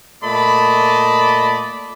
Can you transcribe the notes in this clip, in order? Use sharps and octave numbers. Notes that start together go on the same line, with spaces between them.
A#2 A3 D5 D#5 A5 B5